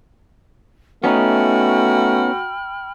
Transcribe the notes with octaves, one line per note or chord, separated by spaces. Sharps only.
A3 B3 C#4 D#4 F#4 G5 B5 F6